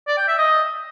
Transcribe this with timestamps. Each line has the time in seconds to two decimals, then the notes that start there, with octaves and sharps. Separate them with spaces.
0.07 D5
0.18 G5
0.28 E5
0.38 D#5